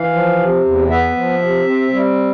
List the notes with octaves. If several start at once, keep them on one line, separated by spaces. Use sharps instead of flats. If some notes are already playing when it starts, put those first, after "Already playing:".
Already playing: E3 F5
F3
C3
E2
B3 E5
F3
C3
C4
G3